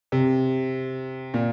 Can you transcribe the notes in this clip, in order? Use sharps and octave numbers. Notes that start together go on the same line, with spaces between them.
C3
A#2